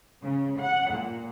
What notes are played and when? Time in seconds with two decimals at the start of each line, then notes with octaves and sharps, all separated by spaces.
0.23 C#3
0.58 F#5
0.91 A#2